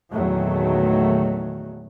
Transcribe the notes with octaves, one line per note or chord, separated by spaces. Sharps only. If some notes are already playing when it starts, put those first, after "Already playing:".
E2 A#2 D#3 F#3 A3